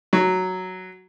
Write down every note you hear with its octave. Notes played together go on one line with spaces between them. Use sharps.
F#3